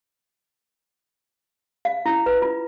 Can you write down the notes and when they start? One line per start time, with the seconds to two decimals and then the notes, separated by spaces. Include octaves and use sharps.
1.85 F5
2.06 E4
2.26 B4
2.42 F4